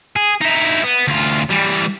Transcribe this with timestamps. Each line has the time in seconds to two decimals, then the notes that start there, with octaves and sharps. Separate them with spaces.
0.16 G#4
0.42 D#4 E4
0.84 B3
1.07 D2 F4
1.50 E3 G3